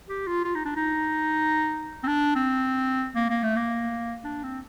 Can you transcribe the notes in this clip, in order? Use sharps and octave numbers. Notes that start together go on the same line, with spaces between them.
G4
F4
F4
D#4
D4
D#4
C4
D4
C4
A#3
A#3
A3
A#3
D4
C4